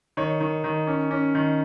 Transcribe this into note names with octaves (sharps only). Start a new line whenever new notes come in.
D#3 C#5
D#3
D#3
C#4
C#4
D#3